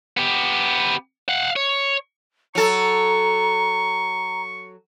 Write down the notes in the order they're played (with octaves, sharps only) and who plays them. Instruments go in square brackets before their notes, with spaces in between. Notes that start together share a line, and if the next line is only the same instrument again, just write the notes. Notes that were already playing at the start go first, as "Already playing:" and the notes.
[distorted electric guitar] B3 G4
F5 F#5
C#5
[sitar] F#3 A4 [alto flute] A#5 [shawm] C#6